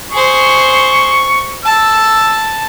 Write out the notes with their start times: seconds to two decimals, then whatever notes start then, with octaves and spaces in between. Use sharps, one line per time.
0.12 G#4 C5 C#6
1.65 A5 E6